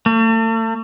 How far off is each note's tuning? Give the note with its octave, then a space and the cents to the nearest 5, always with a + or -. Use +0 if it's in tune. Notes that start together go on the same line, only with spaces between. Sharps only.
A3 +40